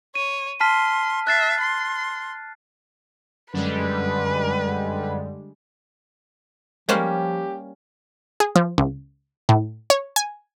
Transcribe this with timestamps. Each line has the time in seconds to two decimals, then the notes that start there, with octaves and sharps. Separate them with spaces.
0.15 C#5 D#7
0.61 A5 C6 F6 B6
1.27 E5 F#6 A6 C7
1.60 C6
3.54 F#2 D3 G3 G#3 B4
6.89 F3 G3 G#3 A#3 C#4 G4 C5 F#6
8.40 G#4
8.56 F3
8.78 C#2
9.49 A2
9.90 C#5
10.16 G#5